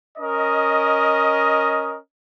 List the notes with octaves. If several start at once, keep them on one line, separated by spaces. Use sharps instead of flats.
C#4 A#4 D#5